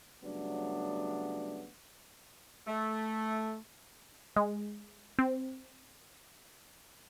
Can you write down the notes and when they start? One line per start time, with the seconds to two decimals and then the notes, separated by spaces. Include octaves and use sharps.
0.23 C#3 F#3 G3 A3 B3 D4
2.67 A3
4.36 G#3
5.19 C4